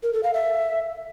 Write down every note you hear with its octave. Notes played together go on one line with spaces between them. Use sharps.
A#4
A4
F5
E5